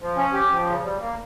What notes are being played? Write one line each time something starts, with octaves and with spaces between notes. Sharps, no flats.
F3
C#4
G4
F3
C#3
G3
A#3